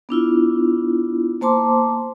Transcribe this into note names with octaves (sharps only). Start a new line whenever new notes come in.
B3 D4 E4 F4
A#3 C5 A5 C6 D6